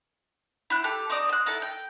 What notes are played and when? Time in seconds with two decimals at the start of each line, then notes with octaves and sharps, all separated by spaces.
0.70 E4 C5 F#6
0.84 G4 A4
1.10 C4 D#4 D5 D#6
1.29 C5 F#6
1.46 D#4 E4 A4 A5
1.62 G5